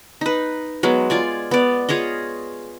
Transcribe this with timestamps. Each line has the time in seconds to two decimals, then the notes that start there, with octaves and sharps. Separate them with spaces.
0.21 D#4 B4
0.83 F#3 G#3 B3
1.10 F4 D5 G#5
1.51 B3 D5
1.89 F4 G#4 C#5 D#5